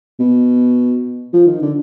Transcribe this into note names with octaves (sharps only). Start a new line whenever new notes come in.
B2
F3
D#3
D3